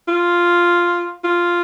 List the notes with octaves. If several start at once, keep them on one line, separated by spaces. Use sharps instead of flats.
F4
F4